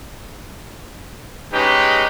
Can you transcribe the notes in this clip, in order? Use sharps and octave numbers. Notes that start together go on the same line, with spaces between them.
G#3 C#4 D#4 G4 B4